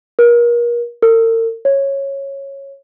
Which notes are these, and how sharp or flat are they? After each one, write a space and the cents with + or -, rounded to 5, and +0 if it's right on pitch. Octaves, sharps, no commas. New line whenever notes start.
A#4 +35
A#4 -45
C#5 -10